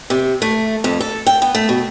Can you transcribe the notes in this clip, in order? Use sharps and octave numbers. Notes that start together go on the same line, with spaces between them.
C3
A3
F2
A4
G5
B3
A3
B2